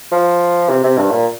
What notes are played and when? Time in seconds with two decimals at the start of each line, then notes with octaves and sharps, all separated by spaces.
0.12 F3
0.69 C3
0.83 C3
0.98 G2
1.11 A#2